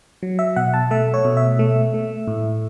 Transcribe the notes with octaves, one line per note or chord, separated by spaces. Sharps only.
F#3
E5
B2 F#5
A5
A3 E5
C#5
B2
E5
A3
A3
A2